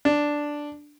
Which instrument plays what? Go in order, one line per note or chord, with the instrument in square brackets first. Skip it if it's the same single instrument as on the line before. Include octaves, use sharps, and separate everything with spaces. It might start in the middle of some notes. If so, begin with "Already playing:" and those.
[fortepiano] D4